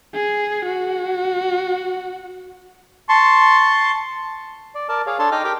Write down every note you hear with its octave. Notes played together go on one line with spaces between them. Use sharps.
G#4
F#4
A5 C6 C#6
D5
A#4 D5 A5
G#4 C#5 F5
D4 A4 C#5 A5 C6
D#4 D#5 G5 D6 F6
G4 A#4 G5 D6